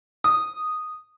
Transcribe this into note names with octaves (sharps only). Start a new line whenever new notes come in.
D#6